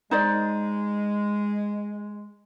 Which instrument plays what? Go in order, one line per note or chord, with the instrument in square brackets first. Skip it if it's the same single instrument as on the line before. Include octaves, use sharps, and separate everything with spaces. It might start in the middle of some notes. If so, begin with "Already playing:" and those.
[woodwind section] G#3 [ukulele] D#4 C5 D5